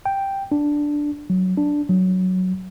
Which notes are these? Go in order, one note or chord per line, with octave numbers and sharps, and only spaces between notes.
G5
D4
F#3
D4
F#3